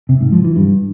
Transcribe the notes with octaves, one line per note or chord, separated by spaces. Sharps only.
C3
G#2
F3
E3
G2